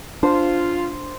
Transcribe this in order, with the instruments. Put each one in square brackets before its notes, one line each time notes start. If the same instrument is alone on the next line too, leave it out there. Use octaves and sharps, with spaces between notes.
[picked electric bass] D4 [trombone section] F4 [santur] C5